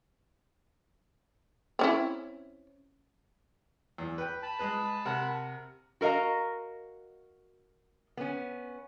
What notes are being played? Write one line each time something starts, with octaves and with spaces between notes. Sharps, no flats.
C4 C#4 E4
E2
B4 G5
A5 B5
G#3 G#4 B4
C3 A#4 F#5
F#4 A#4 D#5 F5 A#5
B3 C#4